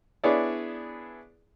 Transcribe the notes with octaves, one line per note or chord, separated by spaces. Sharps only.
B3 D4 E4 G#4 C#5 D5